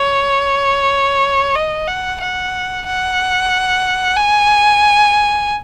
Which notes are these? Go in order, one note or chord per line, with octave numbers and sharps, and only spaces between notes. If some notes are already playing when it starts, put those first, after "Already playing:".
Already playing: C#5
D#5
F#5
F#5
F#5
G#5